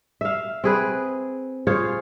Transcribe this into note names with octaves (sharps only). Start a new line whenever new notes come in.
E5 F5
C4 G#4 B4
F4 G#4 C5 C#5